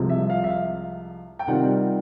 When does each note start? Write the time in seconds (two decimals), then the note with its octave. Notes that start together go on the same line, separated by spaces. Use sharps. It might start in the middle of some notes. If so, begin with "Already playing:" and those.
Already playing: C2 C3 F3 G#3
0.10 E5
0.30 F5
0.44 E5
0.50 F5
1.39 G5
1.48 C3 D#3 G3 C4 F4 F#5